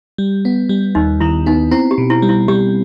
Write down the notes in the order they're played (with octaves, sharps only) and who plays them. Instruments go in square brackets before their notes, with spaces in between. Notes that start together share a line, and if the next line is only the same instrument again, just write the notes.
[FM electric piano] G3
B3
G3
[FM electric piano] D#2 [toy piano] D#4
[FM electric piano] D#3 [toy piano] E4
[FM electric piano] B3 [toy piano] D#4
[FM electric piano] C4 [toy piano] E4
[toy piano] G4
[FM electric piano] B2
[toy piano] E4
[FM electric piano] G3
[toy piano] E4
[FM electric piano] G3 [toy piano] G4